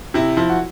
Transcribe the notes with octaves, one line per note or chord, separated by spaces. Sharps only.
C3 E4
F3 E4
F#4